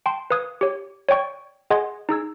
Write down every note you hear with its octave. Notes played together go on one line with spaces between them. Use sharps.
G5 A5 C6
B4 F5 D#6 G#6
G4 C#5
C#5 D5 G5 C#6
G#4 D#5 F#5 G#5 C6 G#6
D#4 G#4 E6 G#6